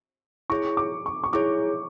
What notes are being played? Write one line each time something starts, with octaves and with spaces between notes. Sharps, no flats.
E4 G#4 C#5 C#6
D6
C#6
C#6
E4 G#4 C#5 D6